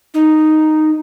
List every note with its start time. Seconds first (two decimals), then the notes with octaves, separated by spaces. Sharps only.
0.14 D#4